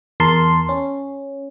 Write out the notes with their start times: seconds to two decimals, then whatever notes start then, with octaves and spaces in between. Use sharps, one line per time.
0.20 E2 A#4 A5 C6
0.69 C#4